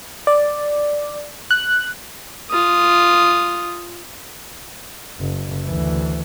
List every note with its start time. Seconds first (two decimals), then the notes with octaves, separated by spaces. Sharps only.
0.27 D5
1.51 F#6
2.50 F4 D#6
5.20 F#1
5.65 D2 E3